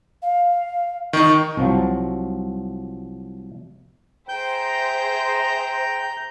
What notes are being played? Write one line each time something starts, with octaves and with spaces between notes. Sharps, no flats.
F5
D#3 D#4 C#6
C2 F3 F#3
G#4 C5 E5 G5 A#5 G6